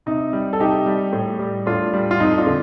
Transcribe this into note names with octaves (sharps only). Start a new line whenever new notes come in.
C3 D#4
G3
A4
C3 D#4 G4
G3
A2
G3
A2 D4 F4
G3
F4
F2 D#4
D4 F4
D3